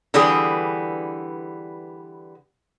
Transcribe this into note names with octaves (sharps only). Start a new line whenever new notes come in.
D3 E3 G3 B3 G#4